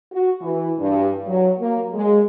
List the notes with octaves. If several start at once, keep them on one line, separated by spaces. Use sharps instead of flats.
F#4
E3
G2
F#3
A#3
G#3